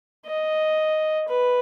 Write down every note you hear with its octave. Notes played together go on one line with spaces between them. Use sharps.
D#5
B4